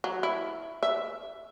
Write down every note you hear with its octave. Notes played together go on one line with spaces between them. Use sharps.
F#3
E4
E5